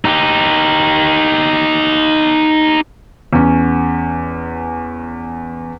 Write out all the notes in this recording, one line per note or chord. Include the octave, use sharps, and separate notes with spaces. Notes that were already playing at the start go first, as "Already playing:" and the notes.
D#4 G4
E2 C#4